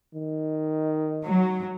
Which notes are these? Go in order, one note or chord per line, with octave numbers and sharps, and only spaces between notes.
D#3
F#3